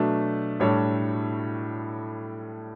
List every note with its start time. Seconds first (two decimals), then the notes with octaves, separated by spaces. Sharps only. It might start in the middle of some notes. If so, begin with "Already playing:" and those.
Already playing: B2 F#3 A3 D4
0.60 A2 G3 D4 A4 C#5